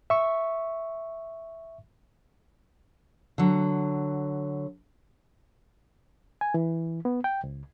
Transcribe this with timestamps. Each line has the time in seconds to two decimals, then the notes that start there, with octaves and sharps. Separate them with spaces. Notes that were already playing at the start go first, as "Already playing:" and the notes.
0.10 E5 C#6
3.38 D3 F#3
6.41 G#5
6.54 E3
7.05 B3
7.24 G5
7.44 C#2